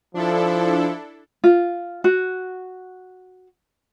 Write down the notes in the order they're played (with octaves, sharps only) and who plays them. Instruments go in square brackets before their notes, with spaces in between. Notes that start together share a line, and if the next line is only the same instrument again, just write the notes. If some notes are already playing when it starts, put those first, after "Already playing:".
[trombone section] F3 [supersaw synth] D4 E4 A4
[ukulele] F4
F#4